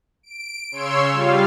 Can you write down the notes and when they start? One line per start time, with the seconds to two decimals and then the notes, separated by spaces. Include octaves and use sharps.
0.23 D7
0.71 C#3 C#5 C6 E6
1.11 G3 F4 F5